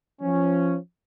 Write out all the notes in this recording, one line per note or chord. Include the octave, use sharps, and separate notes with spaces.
F3 C#4